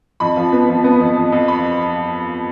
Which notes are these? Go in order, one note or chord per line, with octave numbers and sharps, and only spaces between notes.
F2 B5
F3
B3
F3
B3
F2
F2
F2
B5